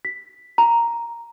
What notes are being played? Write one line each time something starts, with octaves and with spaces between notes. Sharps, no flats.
B6
A#5